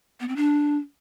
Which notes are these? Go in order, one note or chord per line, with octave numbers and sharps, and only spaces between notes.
B3
C4
D4